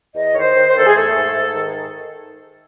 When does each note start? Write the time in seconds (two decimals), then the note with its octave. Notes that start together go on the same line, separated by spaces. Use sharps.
0.14 E2 D#5
0.33 D#3 C#5
0.40 C5
0.54 D#3
0.68 C5
0.75 E2 A4
0.86 G#4
0.94 A3 A4
1.14 G#2
1.36 G#2
1.55 D#3